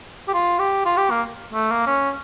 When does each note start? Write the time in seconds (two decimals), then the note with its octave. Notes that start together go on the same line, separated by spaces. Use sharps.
0.28 G4
0.34 F4
0.59 G4
0.85 F4
0.97 G4
1.10 A#3
1.53 A3
1.71 A#3
1.87 C#4